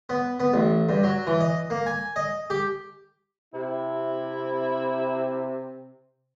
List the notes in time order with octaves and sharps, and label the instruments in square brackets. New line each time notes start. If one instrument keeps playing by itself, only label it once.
[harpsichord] B3
B3
A1
G2
F#3
E3
D#5
A#3
G#5
D#5
G4
[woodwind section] C3 [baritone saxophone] E4